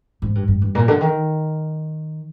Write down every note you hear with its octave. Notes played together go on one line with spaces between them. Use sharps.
G#2
G2
G2
G2
A#2
D3
D#3